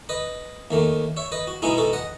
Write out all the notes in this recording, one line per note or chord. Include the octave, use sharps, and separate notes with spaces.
B4 D#5
D#2 D#3 A3
C#5 E5
B4 D#5
F#4
B2 G#3 B3 D#4 E4 G#4
F#4 A4
D#5 F#5